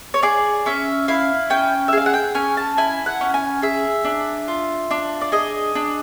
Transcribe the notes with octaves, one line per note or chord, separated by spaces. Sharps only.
C#5
G#4 D5
C#4 E5
E4 F5
C#4 G5
E5
G#4 F5
F#5
G5
C#4 G#5
A5
E4 G#5
F#5
C#4
G#5
G#4 E5
D4
F4
D4
D5
G#4 D#5
D4